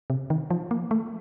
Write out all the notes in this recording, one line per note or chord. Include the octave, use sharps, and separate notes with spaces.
C3
D#3
F3
A#3
A3